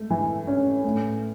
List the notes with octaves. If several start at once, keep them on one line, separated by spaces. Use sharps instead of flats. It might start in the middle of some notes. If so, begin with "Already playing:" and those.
Already playing: G#2 A3
E3
C#4
A2